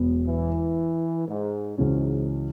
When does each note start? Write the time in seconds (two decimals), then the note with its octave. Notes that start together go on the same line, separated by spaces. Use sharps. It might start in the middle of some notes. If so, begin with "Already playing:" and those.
Already playing: E1 E2 B2 F#3 B3
0.27 E3
1.28 G#2
1.78 C#2 G#2 C#3 E3 C#4 F#4